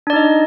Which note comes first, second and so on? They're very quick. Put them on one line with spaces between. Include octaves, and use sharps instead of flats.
D4 D5 D#4 D#5